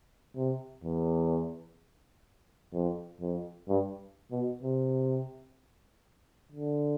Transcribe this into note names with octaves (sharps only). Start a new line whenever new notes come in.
C3
E2
F2
F2
G2
B2
C3
D3